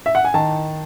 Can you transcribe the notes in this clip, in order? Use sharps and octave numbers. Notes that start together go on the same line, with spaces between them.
E5
F#5
G#5
D#3 A5